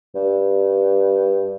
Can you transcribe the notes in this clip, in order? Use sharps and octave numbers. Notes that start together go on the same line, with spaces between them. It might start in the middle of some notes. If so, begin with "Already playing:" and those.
G2